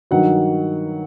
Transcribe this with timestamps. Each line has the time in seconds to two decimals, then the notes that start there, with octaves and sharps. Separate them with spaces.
0.11 G2 D#3 F#3 F#5